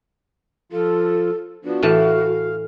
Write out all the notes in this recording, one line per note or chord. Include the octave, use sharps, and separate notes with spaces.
F3 F4 A4
F3 B3 D4 F#4
A2 E3 F5 A5